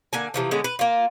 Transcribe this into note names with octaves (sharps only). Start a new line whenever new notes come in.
D3 A#3 G#5
C3 E3 F3
D3 G#3 B3 C#4
B4
A#3 F4